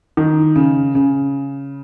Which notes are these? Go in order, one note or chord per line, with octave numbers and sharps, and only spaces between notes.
D#3
C#3
C#3